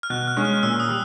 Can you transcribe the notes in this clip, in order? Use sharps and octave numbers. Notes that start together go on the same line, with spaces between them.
F6
B2 F#6
F6
G#3 C#4
F6
A#2 E6
D#6
G3